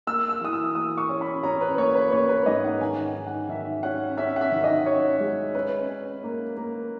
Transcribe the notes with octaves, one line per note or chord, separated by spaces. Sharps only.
A#3 E6
E6
E3 D#6
E6
A#3 D#6
C#6
C#4
B5
C#4 A#5
B4
A#3 C#5
B4
A#3 C#5
B4
G#2 D#5
F#5
D#3 G#5
D#3
F#5
D#3 E5
C#4 F#5
C#4 E5
F#5
E5
D#3
D#5
C#4 C#5
G#3
C#4 B4
C#4
A#3
A#3